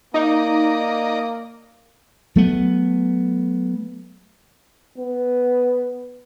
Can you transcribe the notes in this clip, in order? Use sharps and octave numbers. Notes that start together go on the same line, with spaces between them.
A#3 D#4 D5 D#5 A#5
F#3 A3 B3
B3